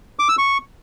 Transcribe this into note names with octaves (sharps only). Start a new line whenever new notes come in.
D6
E6
C#6